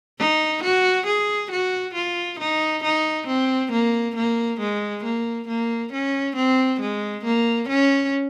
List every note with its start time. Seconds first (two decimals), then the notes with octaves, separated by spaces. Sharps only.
0.19 D#4
0.63 F#4
1.07 G#4
1.51 F#4
1.95 F4
2.40 D#4
2.84 D#4
3.27 C4
3.72 A#3
4.16 A#3
4.61 G#3
5.05 A#3
5.48 A#3
5.93 C#4
6.36 C4
6.81 G#3
7.25 A#3
7.69 C#4